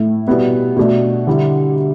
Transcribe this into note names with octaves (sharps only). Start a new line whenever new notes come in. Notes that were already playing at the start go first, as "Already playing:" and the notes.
Already playing: A2 A3 E4
B2 G3 B3 E4
B2 A3 D4
D3 G3 E4